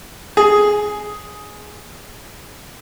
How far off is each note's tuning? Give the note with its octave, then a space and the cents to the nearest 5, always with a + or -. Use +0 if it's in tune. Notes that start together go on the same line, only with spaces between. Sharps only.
G#4 +5